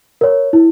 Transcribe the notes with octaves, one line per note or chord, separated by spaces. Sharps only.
A#4 C#5
E4